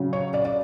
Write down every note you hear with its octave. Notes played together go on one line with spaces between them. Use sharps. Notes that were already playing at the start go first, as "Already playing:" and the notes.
Already playing: C#3 F#3
C#5
D5
D5